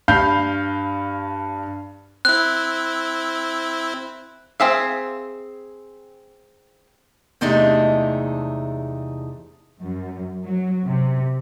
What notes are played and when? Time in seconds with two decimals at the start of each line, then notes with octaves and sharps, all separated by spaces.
0.08 G2 F5 B5 G6
2.25 C4 E4 F#6
4.60 C4 G#4 E5 F5
7.41 E2 C3 G#3 A3 D4 D#4
9.81 F#2
10.44 F#3
10.86 C3